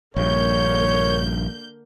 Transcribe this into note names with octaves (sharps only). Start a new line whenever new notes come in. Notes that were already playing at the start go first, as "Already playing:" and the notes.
A#1 G2 D3 A#3 C#5 G6